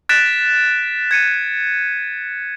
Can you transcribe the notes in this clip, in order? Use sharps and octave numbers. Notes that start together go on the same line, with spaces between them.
F#6 A6 B6 D7 E7
G#6 C#7 D#7